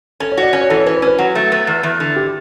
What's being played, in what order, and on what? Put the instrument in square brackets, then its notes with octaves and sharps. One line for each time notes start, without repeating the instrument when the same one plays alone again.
[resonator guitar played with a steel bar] C#4 [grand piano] A4
[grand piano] C#5
[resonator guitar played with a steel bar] F#4 [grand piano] D5
[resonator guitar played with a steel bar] C#4
[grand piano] C#5
[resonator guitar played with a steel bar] E3 [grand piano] A4
[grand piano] C#5
[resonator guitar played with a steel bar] C#4 [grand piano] B4
[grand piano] B4
[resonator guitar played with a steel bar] C#4
[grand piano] B4
[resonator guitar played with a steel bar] F#3 [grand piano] F#5
[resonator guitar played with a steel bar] A3
B3
E2
E2
D3
[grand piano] G4